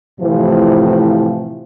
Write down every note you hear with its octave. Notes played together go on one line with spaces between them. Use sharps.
A2 C3 E3 F3